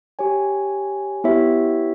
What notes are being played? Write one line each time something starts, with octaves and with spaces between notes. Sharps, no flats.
G4 C#5 G#5
B3 E4 G4 C#5 E5